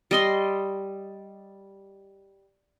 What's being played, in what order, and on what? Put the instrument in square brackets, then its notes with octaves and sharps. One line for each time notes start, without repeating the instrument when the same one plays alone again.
[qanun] G3 D#5 C6